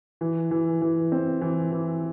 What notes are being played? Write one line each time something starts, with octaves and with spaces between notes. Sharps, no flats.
E3
E3
E3
C4
E3
E3